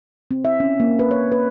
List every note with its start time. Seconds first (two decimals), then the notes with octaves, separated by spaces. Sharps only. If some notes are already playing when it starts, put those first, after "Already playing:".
0.31 C4
0.45 E5
0.60 C#4
0.80 A#3
0.99 B4
1.11 C#5
1.32 B4